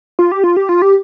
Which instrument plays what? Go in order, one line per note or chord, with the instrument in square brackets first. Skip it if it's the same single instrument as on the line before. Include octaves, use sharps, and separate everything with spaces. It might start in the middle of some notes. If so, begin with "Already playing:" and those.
[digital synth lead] F4
G4
F4
G4
F4
G4